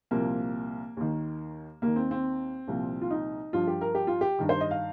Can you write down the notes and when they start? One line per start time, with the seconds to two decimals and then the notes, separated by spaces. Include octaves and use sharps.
0.11 C2 A#2 F3 A#3
0.97 D#2 D#3
1.82 D#2 D#3 A#3
1.96 C4
2.11 C4
2.68 C2 A#2 F3
3.02 F4
3.11 D#4
3.53 G2 F3 F4
3.67 G4
3.81 A#4
3.95 G4
4.07 F4
4.21 G4
4.39 G2 D#3
4.49 C5
4.61 D#5
4.71 F5